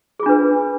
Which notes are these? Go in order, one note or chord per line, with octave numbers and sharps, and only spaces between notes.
D4 F4 G#4 B4